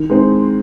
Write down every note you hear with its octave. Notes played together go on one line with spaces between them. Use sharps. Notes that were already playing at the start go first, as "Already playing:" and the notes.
Already playing: D#3
G#3 C4 D#4